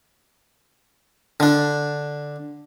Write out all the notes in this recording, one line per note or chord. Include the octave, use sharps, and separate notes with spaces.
D3 D4